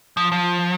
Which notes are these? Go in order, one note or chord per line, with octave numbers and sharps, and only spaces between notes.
F3
F3